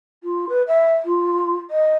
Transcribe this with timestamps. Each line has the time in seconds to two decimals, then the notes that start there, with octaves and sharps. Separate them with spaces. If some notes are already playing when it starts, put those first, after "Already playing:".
0.24 F4
0.49 B4
0.68 E5
1.05 F4
1.70 D#5